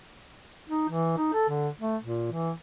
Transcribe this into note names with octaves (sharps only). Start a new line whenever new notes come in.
D#4
E3
D#4
A4
D3
A3
A#2
E3